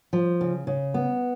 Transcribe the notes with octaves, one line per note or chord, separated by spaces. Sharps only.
F3
C#3
C#3
B3